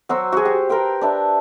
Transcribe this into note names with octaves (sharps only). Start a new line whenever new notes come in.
F#3 F#4 C5 E6
F#4 G#4
G4
A#4 B4 G5 C6
D4 B4 E5